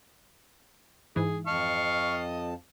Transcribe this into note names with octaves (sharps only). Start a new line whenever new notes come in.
G#2 E3 G#4
F2 D#5 F5 A5 C#6